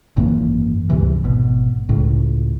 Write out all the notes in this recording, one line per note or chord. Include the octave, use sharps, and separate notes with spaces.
G#1 F#2 E3 A#3
C#2 G2 C3 E3
G#1 B2
C#2 A2